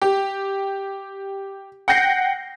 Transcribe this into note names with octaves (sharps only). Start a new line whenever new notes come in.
G4
F#5 G5 G6 A#6 C7